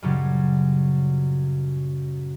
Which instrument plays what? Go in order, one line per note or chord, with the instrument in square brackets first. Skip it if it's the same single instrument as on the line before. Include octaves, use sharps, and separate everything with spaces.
[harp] F#2 A#2 C#3 F#3 G3 C#4